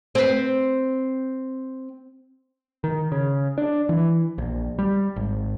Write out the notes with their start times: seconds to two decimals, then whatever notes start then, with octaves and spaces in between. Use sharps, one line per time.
0.15 C4 B4
2.84 D#3
3.12 C#3
3.58 D4
3.89 E3
4.38 A#1
4.79 G3
5.16 G#1